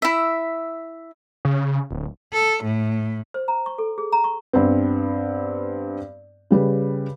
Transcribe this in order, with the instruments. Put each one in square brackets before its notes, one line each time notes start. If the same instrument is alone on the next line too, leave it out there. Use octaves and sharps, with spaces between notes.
[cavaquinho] E4 E5
[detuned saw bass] C#3
D1
[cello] A4
A2
[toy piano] C5
A#5
C#6
A4
G#4
A#5
C#6
[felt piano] G2 B3 C4
C#3 G3 B4